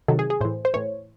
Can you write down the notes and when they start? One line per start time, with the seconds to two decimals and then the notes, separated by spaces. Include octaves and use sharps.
0.08 C3 D#3 F#3 A4
0.19 G#4
0.30 G#4
0.41 A2 E3 C5
0.65 C5
0.74 A2 E3 C#5